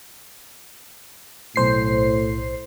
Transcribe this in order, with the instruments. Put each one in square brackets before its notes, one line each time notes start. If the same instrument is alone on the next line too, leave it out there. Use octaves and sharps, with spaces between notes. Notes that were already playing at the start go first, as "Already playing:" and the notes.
[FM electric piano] B1 C5 C7 [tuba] A2